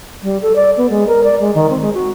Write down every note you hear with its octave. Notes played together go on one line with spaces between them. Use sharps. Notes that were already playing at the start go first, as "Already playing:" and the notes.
G3
A4
D5
B3
G#3
A#4
D5
G#3
D#3
C4
G#3
F#4